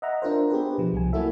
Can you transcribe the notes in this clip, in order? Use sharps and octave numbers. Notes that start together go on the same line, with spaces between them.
D#5 E5 F#5 A#5
D4 F4 A#4 C5
B3 G4 G#4 B4
B2 F3
C2 F3 G#5
F#3 A#3 E4 F#4 A4 E5